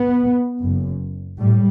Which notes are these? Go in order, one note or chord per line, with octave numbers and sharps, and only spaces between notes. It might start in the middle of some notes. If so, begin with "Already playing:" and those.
Already playing: B3
F#1 F#2
A2 G3